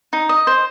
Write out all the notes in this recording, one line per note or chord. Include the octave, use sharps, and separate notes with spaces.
D#4
D#5
C5